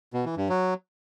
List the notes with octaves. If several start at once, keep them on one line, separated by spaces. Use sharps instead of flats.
B2
E3
G2
F#3